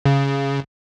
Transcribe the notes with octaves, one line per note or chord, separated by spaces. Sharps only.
C#3